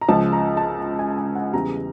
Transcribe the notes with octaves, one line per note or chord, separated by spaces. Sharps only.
A#5
C#2 C#3 F3 A5
A#5
A5
G#5
G#5
F#5
E2 C#3 E3 G3 A#5